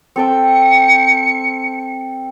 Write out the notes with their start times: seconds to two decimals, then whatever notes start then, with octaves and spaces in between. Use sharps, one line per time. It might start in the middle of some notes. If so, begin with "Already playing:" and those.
0.16 C4 A4 G5 C#7